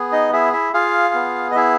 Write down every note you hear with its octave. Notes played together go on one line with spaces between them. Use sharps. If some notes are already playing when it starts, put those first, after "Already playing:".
Already playing: B3 G#4
D#4 D#5
E4 G#4 E5
E4 E5
F4 G#4 F5
B3
D#5
E4 G#4 E5